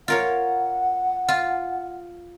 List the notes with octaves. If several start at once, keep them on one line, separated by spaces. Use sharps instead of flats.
F4 A#4 C#5 F#5
F4